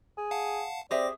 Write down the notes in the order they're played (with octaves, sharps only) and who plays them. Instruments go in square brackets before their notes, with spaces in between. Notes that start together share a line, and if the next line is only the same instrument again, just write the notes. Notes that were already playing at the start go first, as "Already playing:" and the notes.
[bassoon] G#4
[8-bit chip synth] F5 F#5 A5
[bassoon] C4 [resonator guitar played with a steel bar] G4 G#4 E5 [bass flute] D5 [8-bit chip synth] D6 A#6